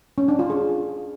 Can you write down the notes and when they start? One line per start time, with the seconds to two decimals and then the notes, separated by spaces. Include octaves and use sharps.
0.18 C#4
0.28 D4
0.39 F4
0.50 G#4